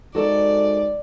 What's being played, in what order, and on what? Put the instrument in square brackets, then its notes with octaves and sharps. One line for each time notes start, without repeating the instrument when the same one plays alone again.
[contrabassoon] G#2 [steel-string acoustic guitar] F#4 A4 A#4 [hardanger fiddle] D5